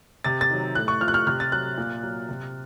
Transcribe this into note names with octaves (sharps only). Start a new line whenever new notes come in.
C3 A6
A6
D#3 F#3
A2 F#6
C#6
F3 F6
F#6
F6
C3 F6
A6
F#3 F#6
A#2
F#3
C3